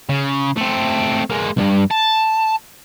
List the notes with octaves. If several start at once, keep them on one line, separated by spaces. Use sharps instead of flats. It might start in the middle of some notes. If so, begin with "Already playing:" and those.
C#3
A3 C4
G#3 A#3
B1 G2
A5